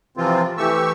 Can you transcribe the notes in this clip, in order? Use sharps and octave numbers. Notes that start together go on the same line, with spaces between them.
C3 E3 F3 C4 F4
E3 A3 G4 C#6 E6